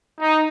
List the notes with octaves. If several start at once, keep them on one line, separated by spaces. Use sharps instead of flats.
D#4